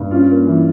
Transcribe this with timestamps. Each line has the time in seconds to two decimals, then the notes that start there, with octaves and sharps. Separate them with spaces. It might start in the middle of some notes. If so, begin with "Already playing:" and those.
Already playing: G2
0.11 C#4 F4
0.29 A#3
0.47 E3